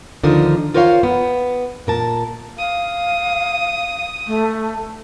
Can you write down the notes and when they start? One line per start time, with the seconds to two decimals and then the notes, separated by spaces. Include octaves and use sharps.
0.23 D2 D3 D#3 F3 D#4 A#4
0.74 F4 A#4 C5 C#5 E5 F5
1.03 B3
1.87 A#2 A#4 A5
2.58 F5 D#6
4.27 A3